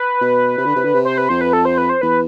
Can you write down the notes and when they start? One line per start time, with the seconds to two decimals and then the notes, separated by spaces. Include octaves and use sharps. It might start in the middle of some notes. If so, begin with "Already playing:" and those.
Already playing: B4
0.21 B2
0.58 C3
0.66 D3
0.76 C3
0.84 D3
0.93 C3
1.05 C5
1.18 B4
1.29 F2 C5
1.41 B4
1.53 A4
1.65 C5
1.78 B4
1.89 C5
2.01 E2 B4